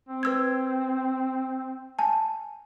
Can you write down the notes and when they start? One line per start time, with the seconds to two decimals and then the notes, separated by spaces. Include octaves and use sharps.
0.09 C4
0.23 B4 E6 G#6
1.99 G#5 A5